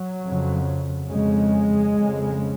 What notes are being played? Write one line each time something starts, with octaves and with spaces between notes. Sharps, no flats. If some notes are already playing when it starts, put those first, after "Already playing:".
Already playing: F#3
F2 C#3
F2 C#3 G#3
F2 C#3